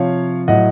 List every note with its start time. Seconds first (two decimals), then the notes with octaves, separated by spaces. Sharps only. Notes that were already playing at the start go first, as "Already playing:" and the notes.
Already playing: C3 F3 C#5 F5
0.48 A2 F#3 D#5 F#5